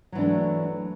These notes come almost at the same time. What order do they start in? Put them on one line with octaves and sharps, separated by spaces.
F#3 E3 D4 A3